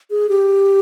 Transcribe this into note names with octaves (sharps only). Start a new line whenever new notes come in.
G#4
G4